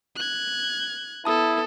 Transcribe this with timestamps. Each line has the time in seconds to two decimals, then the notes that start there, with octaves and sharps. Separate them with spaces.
0.16 F#6 G#6
1.25 B3 E4 A4 A5 D#6